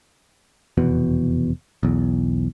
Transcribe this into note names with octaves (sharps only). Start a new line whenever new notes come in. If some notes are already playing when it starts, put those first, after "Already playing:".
F1 E2 B2
B1 E2